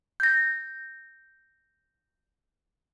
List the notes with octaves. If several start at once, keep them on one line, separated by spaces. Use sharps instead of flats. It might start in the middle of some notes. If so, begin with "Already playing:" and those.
G6 A#6